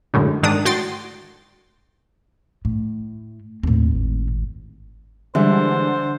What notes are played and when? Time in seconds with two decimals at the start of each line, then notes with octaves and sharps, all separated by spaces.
0.14 F#2 A2 D3 F#3 G#3
0.43 G#2 D#3 D4 D#6
0.65 A2 F#4 G5 C6 A6
2.65 A2
3.63 D#2 A2 C4
3.93 G#1
5.35 D3 E3 G3 G#3 C5